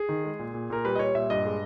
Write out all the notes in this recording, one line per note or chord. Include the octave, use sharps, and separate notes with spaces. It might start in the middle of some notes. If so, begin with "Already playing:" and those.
Already playing: G#4
D#3
G#3
A#2
A#2
A#2 A#4
G3 B4
D#5
G3 C#5
A#2 E5
G2 D#5
G#3